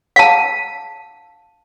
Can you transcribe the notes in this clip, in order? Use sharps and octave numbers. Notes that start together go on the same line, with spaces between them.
F5 A5